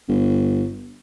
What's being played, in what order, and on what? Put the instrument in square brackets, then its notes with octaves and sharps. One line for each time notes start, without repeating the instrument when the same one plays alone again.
[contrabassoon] G1